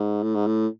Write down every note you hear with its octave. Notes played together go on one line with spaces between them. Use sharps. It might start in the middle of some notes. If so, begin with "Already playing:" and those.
Already playing: G#2
A2
G#2
A2